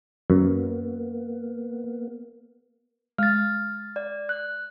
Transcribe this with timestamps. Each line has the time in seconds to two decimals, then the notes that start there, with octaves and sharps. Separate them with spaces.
0.30 F#2 A#3 B3
3.18 G#3 F6 A6
3.96 D5
4.29 F#6